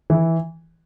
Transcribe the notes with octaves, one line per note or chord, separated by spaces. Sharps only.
E3